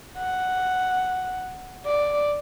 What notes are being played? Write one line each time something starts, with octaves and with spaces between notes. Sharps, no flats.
F#5
D5